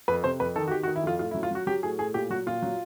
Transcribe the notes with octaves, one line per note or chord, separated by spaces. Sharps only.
F2 B4
C3 C5
F2 B4
D#3 A4
F#4
D#3 G4
F#4
D#3
E4
F2 F4
A2 F4
E4
F#3
F4
F#3 F#4
F#3 G4
A2 G#4
A2 G#4
A#2 G4
F#3 F#4
A#2 F4
F#3